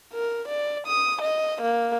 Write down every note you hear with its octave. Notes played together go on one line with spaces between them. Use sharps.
A#4
D5
D#6
D#5
A#3